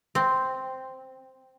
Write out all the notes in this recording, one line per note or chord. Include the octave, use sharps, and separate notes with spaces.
C4